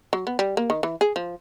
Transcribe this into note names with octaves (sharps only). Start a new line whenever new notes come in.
F#3
B3
G3
A#3
D#3
E3
G#4
F3